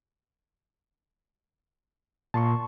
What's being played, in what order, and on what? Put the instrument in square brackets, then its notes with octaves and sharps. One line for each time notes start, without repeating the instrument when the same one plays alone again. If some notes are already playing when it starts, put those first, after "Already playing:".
[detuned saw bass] A#2 [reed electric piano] A5 C6 C#6